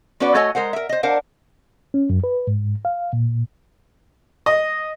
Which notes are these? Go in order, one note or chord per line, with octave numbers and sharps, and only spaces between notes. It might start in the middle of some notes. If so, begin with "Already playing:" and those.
B3 C#4 F#4 B4 D5
A3 F#4 A4 C#5 D#5 G#5
G#3 A#4 C5 F#5
A#4 E5
C5 D#5
D4 A#4 C5 F5 F#5
C#4
F#2
B4
G#2
F5
A#2
D#5